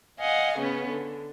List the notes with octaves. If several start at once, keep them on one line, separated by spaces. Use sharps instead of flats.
D#5 F5 F#5 G#5
C#3 B3 C#4
D3